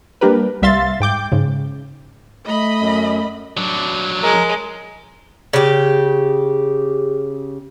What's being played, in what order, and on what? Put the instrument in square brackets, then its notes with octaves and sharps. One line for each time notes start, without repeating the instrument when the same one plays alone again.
[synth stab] G3 A#3 D4 G4 A#4 B4
C2 G3 E5 F5 C6 A6
G#2 G5 D6 G6
G#2 C#3
[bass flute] A3 [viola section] D#5 B5
[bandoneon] F#2
[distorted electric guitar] F#3 D4
[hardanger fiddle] G#3 [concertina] A#4
[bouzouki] C#3 G4